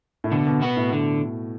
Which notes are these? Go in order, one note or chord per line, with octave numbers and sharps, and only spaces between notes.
A2
B2 D3
B2
B2 B3 F#4 B4
A2
B2 D3